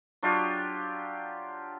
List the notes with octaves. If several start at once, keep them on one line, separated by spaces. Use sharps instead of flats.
F#3 D4 F4 G4